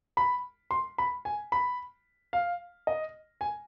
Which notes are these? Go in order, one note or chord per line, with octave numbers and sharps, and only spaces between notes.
B5
C6
B5
G#5
B5
F5
D#5
G#5